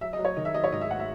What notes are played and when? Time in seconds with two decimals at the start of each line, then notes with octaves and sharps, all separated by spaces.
0.01 F#3 E5
0.13 D#5
0.19 F#3
0.25 C#5
0.37 D#3 D#5
0.45 E5
0.54 F#3 D#5
0.64 C#5
0.72 G#2 D#5
0.81 E5
0.91 F#5
1.00 E5